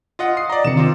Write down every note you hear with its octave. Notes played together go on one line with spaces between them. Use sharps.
F4 D#5 F#5
D#6 C7
D5 D#5 A#5
C3 D#3 C4 C#7 E7
C4 F4 D6